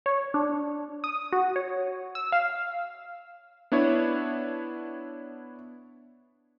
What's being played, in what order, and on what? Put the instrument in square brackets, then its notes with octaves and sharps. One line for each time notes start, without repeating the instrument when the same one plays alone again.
[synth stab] C#5
D4
D#6
F#4
C#5
E6
F5
[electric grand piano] B3 D4 E4 C#5